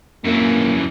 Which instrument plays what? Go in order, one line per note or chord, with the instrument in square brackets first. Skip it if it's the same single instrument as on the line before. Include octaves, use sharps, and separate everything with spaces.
[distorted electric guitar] F#2 E3 [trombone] A#3